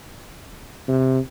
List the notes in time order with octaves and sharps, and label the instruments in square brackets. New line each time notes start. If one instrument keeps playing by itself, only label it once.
[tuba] C3